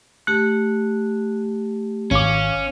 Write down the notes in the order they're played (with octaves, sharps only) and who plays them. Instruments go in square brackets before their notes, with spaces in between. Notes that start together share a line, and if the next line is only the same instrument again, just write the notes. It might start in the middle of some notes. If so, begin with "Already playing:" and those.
[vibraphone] A3 G4 [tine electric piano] F#6
[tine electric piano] G#1 D6 [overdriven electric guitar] C#4 [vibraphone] F5